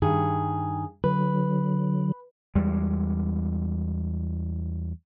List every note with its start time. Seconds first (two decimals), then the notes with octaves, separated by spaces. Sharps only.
0.02 G2 D#3 G#4
1.04 D3 F#3 B4
2.55 E2 G3 G#3